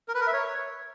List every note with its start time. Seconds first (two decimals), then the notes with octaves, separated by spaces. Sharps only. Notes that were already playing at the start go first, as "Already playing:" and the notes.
0.08 A#4
0.15 B4
0.21 A#4
0.27 E5
0.33 C#5